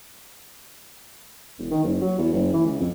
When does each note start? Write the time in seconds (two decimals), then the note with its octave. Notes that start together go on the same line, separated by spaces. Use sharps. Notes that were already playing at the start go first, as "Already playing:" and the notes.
1.58 E1
1.71 D#3
1.84 F#1
2.01 F#3
2.18 E2
2.33 F#1
2.53 E3
2.65 C#2
2.80 F2